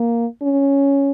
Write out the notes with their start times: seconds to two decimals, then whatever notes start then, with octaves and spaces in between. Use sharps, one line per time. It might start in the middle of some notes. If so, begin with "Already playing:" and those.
Already playing: A#3
0.42 C#4